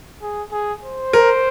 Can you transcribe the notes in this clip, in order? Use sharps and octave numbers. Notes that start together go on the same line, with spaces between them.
G#4
G#4
C5
A#4